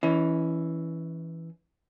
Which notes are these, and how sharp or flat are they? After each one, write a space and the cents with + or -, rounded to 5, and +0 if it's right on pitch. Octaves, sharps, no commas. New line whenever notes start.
E3 +0 C#4 +15 D#5 +40